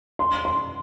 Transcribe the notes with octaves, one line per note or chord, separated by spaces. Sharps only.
C6
C6